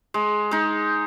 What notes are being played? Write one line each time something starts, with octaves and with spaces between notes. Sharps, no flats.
G#3
G#3 D#4